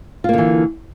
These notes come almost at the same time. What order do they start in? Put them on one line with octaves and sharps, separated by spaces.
F4 A#3 D3 E3